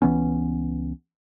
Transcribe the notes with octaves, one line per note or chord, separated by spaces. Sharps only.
C#2 E3 B3 C#4